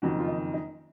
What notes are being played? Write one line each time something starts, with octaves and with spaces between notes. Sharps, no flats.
F#1 F2 D#3 F#4
F4
D#4
D#4